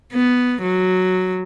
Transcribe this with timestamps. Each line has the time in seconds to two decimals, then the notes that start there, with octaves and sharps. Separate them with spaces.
0.13 B3
0.62 F#3